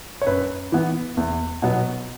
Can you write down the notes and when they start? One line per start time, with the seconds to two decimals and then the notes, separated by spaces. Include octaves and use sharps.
0.22 C#5
0.27 F#2 B4
0.72 E3 B3
1.17 E2
1.62 B2 F#3 B3